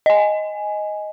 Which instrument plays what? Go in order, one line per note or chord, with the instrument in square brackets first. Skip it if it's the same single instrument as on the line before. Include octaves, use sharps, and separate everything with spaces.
[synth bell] D#5 G#5